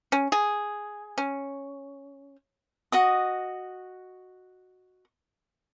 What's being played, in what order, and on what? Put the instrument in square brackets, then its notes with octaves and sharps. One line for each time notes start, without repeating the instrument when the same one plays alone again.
[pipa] C#4
G#4
C#4
[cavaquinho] F#4 D#5 D#6